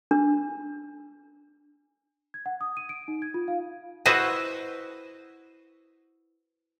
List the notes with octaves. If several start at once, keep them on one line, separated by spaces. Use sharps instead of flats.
D4
G#6
F#5
D#6
D#7
D7
D#4
G#6
F4
F5
E4 F#4 B4 C5 D#5